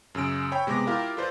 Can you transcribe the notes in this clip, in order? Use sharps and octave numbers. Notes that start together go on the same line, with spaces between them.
F#2 C#3 E6 D7
C#5 G5 B5
C3 G#3 B3 D6 A#6
E4 F4 G4 A#4 F5
F4 A4 B4 C5 D5